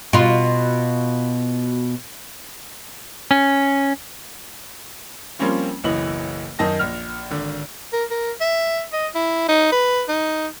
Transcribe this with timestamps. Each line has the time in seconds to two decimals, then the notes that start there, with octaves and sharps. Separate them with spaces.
0.13 B2 F4
3.31 C#4
5.39 F3 G3 A#3 C4 C#4 F4
5.84 F#1 B1 E3 D#5 F#7
6.59 F#2 D#3 D#5 A5 A#6
6.79 A#1 F6
7.31 G#1 D3
7.93 A#4
8.10 A#4
8.41 E5
8.93 D#5
9.15 E4
9.49 D#4
9.72 B4
10.08 D#4